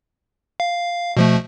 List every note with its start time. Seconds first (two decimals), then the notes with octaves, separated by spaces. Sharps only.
0.60 F5
1.17 B2 F3 A3